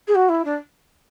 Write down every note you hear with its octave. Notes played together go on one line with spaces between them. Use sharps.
G#4
F#4
E4
D4